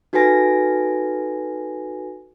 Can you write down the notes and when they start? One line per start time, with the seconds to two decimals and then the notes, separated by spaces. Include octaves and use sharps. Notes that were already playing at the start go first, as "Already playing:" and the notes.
0.13 D#4 F#4 A4 B4 G#5 A#6